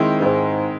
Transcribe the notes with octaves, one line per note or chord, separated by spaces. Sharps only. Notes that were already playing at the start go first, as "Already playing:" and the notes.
Already playing: D#3 G#3 C4 E4
G2
G#2